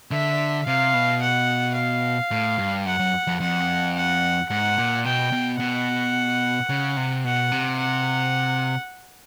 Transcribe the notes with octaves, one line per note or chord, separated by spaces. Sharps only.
D3 E5
C3 F5
B2
F#5
F5
A2
G2
F#2 F#5
F#2
F2
F2 F#5
F#5
G#2 F#5
A#2
B2 G5
B2
B2 F#5
C#3
C3
B2 F#5
C3
F#5